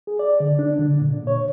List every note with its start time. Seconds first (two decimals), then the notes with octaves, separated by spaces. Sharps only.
0.07 G#4
0.19 D5
0.40 D3
0.59 D4
0.79 D3
1.01 A#2
1.27 C#5